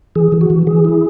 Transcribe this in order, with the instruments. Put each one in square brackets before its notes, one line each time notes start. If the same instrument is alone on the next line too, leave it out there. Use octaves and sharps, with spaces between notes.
[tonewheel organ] E3 G#4
E3
F#4
E3
E3 G#4
E4